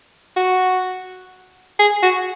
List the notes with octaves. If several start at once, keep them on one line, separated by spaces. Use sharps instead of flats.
F#4
G#4
F#4